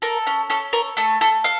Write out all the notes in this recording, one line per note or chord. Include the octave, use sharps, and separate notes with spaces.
A4 A#4
C#4
C#4 A4
A4 A#4
A3 A4
A3 A4
A4 F5